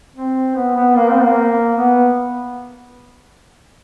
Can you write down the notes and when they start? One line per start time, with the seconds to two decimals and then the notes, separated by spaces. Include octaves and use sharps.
0.16 C4
0.55 B3
0.76 B3
0.96 A#3
1.09 C4
1.22 A#3
1.75 B3